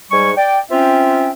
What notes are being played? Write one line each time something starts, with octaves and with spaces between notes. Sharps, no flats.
G#2 G3 G#5 C#6
D5 G5
C4 C#4 F4 E5 G5